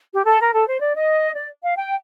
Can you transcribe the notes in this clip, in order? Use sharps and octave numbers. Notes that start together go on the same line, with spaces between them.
G4
A4
A#4
A4
C5
D5
D#5
D5
F5
G5